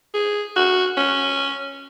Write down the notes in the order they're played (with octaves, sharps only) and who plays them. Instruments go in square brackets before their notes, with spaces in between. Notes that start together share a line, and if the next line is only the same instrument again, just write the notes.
[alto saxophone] G#4
F#4
C#4